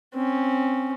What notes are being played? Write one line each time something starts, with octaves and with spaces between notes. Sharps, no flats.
C4 C#4